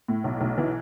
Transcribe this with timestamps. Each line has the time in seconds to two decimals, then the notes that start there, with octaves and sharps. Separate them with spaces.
0.08 A2
0.24 B1
0.41 B1
0.58 E3